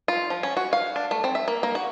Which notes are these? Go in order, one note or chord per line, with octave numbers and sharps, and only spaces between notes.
F4
F3
C#4
F#4
F5
D4
A3
C4
E5
A#3
A#3
F#4